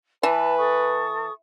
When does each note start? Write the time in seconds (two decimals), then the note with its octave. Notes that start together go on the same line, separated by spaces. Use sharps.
0.23 E3 B4 A5
0.58 A4 C#6 D#6